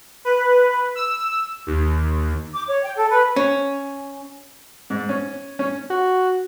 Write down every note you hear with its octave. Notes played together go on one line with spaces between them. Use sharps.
B4
E6
D#2
D6
C#5
G5
A4
B4
C#4
G#2
C#4
C#4
F#4